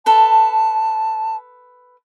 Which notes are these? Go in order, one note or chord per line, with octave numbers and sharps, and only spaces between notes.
A4 B4 A5